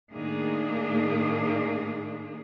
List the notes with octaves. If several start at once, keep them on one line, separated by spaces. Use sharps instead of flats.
A2 D#3 A3 A#3 D4 G#4